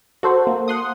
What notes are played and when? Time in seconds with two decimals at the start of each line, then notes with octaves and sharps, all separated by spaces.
0.23 F#4 A4 C5
0.47 A#3
0.68 F#5 C6 D#6